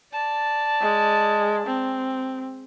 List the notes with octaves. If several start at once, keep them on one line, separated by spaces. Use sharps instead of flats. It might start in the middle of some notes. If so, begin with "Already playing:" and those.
D5 A5
G#3
C4